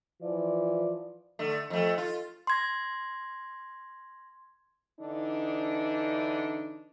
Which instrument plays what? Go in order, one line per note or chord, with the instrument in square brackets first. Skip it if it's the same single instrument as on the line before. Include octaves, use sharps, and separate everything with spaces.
[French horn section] E3 F3 F4 D5
[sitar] D3 A3
F2 A3
F4
[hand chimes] C6 G#6 A#6
[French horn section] D3 E3 D4 D#4